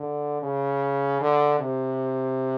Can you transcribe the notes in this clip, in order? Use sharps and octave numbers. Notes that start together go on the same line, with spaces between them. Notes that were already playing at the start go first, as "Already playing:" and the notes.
Already playing: D3
C#3
D3
C3